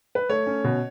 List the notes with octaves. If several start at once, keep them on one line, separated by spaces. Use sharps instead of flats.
B4
A3 C#5
C#4
B2